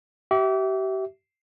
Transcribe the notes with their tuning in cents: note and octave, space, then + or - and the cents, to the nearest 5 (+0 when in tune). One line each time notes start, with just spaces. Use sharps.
G4 -35 E5 -10